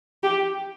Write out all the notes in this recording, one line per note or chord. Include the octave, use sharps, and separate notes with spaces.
G4